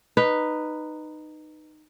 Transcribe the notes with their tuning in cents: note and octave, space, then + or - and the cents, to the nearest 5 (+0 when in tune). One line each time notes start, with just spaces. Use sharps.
D#4 -15 B4 +0